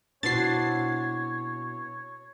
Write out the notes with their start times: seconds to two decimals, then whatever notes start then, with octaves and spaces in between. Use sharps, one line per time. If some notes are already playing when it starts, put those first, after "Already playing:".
0.23 B2 C4 D4 E4 F#4 C#5 A6 C7